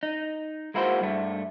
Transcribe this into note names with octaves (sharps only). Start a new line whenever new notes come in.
D#4
G#3 A#3 E4 F#4 C5
G2 A3